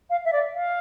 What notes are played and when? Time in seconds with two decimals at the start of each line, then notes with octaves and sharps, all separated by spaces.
0.09 F5
0.24 E5
0.32 D5
0.54 F5